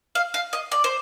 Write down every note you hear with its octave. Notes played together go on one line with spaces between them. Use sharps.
F5
F5
D#5
D5
C5